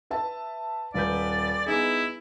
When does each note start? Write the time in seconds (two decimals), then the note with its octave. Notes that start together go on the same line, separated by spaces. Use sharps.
0.10 B4 E5 A5
0.94 D#1 B4 D5 G6
1.66 B3 D#4 E4 G#4